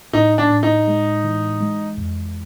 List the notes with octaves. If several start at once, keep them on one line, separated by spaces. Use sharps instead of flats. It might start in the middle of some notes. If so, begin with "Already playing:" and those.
A2 D#4
D4
A2
D#4
G#3
E3
G#3
F2